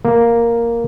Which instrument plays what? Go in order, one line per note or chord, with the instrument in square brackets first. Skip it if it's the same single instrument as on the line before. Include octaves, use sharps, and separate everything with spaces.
[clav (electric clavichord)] A#3